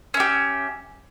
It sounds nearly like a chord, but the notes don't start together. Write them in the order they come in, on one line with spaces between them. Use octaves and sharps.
C#4 E5 G4